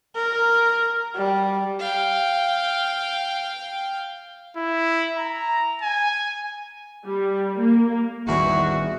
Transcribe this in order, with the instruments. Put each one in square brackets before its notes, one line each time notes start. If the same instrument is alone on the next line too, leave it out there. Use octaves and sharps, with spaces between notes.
[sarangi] A#4
G3
[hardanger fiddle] F5 G5
[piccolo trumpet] E4
A#5
G#5
[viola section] G3
A#3
[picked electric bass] A1 D#3 G3 [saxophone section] E2 [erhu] F#4 [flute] E5